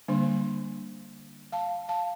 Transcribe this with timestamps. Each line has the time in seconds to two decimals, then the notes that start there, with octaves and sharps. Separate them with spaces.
0.08 D3 G3 A#3 D4
1.52 F5 A5
1.89 F5 A5